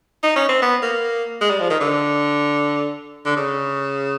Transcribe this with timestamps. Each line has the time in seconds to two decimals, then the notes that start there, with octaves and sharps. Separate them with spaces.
0.23 D#4
0.36 C#4
0.49 C4
0.62 B3
0.83 A#3
1.41 G#3
1.50 G3
1.60 F3
1.70 D#3
1.80 D3
3.25 D3
3.36 C#3